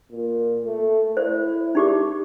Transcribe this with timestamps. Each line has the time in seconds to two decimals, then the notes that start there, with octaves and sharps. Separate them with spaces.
0.12 A#2
0.65 A3
1.17 E4 C5
1.75 D#4 G4 D6